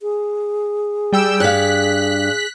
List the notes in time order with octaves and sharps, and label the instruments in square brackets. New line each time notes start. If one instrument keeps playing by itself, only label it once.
[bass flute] G#4
[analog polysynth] G3 G5 E6
[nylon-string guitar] G2 F5 [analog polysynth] F#6 B6